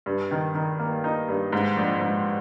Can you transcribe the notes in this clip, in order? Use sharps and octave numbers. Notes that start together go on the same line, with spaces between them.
G2
D#3
D#3
A#3
D#4
G2
G#2
A#1
G#2